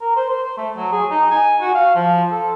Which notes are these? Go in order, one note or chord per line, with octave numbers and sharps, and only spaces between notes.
A#4
C5
C5
A3
F#3
G#4
D#4
G#5
F#4
F5
F3
A4